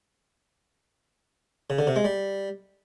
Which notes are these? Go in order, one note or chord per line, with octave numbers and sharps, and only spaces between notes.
C#3
D3
C3
G#3
G3